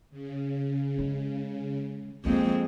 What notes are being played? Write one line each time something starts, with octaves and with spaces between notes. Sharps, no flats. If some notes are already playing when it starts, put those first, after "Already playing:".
C#3
D3 G#3
F2 G#3 A#3 C4 D4